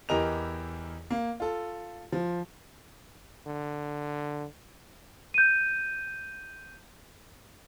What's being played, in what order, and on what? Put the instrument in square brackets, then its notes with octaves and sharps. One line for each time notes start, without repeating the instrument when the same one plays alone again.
[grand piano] E2 E3 G4 A#4 D#5 F7
A#3
F4 A4
F3
[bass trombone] D3
[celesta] G6 D#7